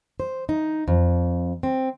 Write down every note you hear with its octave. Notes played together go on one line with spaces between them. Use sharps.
C5
D#4
F2
C4